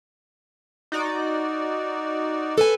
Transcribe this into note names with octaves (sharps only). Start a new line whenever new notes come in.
D#4 F#4 D5
A4 B4 G#5